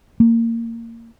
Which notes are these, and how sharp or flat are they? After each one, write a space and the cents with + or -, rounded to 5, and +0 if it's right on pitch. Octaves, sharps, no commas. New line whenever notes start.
A#3 -20